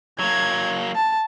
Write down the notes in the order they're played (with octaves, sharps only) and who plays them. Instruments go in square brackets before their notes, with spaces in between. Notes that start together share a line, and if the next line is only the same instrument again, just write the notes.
[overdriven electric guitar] F#3 A#3 [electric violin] G#6
[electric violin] A5